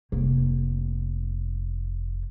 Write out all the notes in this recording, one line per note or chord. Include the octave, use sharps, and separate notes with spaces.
F1 A#3